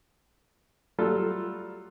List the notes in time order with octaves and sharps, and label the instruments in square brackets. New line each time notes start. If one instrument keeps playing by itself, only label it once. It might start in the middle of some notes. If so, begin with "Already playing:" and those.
[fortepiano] F#3 G3 A3 F4 A4